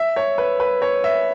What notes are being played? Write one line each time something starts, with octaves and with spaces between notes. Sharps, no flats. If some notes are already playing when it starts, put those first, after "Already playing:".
Already playing: E5
C#5
B4
B4
C#5
E5